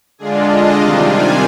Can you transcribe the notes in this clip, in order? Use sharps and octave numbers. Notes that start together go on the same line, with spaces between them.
D3 G#3 D4 F4 G#4
D#5
C3 D#3 G3 D4 F4 F5
G#5